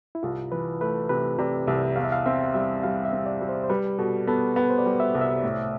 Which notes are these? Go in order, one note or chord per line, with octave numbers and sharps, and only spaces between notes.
E4
C2 F4
E3 B4
A3 B4
C3 B4
C3 D5
C2 E5
E2 F5
E5
F5
C4 E5
G3 E5
G3 F5
E5
C4
D5
G3
C5
C5
G3 B4
B2 A4
B3 A4
B3 G4
C5
D5
G3
E5
C2
E5
A2